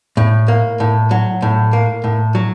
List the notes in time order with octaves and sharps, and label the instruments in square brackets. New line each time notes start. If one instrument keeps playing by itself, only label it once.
[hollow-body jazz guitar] A2
A#3
A2
F#3
A2
A#3
A2
F#3